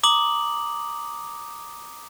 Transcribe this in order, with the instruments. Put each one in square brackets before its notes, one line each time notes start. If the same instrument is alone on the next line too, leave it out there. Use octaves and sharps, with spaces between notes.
[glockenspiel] A#5 D6 D#6 F#7